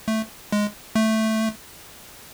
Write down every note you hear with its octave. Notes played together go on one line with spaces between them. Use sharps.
A3
G#3
A3